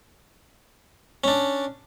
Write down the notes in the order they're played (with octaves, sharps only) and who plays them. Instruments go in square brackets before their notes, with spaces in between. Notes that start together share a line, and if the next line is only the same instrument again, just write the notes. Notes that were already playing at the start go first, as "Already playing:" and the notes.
[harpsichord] C#4 D4